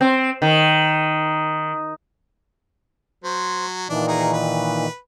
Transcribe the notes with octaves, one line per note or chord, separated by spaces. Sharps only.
C4
D#3
F#3 C5
A#2 D#3 E3 D4
D#4 G#4 A#4
B4